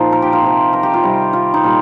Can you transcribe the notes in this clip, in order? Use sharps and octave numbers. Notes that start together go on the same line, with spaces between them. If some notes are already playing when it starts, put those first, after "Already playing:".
Already playing: A#2 F3 D#4 C5
A#4
G4
F4
C3 F3
A#4
G4
F4
C3 D#3 G3
F4
D#4
A#2 G3 F4